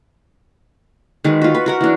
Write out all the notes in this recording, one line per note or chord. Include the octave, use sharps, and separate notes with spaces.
D#3 G#3 F#4 B4
F4 F#4
B4
F#4 A#4 F#5
E3 F#3 D4